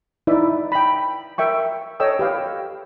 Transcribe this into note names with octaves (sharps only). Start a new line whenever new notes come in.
D#4 E4 B4 D5 E5
G5 B5
A#4 E5 G5 C#6
A4 C#5 D#5 G5 E6
G4 B4 F5 G5